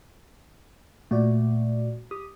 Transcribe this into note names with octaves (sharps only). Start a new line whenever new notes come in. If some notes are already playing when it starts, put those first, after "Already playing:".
A#2 A3 F#4 D5
G4 D#6